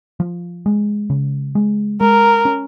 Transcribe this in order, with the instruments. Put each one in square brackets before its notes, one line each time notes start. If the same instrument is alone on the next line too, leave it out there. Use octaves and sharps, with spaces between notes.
[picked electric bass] F3
G#3
C#3
G#3
[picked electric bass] G#3 [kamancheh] A#4
[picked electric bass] C#4